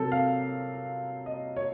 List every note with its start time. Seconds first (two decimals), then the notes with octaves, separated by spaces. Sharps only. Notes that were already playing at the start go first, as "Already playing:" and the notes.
Already playing: C3 F#3 C4 A4 A#4
0.12 F5
1.26 D#5
1.56 C#5